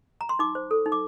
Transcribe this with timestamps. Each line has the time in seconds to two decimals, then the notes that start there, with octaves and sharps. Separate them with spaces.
0.21 A#5
0.29 C6
0.39 D#4 D6
0.55 C5
0.71 A4
0.86 D#4
0.92 D6